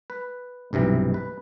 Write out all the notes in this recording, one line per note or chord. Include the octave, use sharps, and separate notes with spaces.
B4
B1 G2 C3 E3
B4